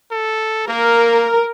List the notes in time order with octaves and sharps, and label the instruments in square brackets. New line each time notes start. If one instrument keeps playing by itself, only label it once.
[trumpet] A4
[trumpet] A#3 [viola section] A#4